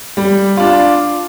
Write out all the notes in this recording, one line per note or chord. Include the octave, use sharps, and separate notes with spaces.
G3
D4 F4